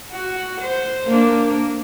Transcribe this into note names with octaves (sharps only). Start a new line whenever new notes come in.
F#4
C5
A#3 D4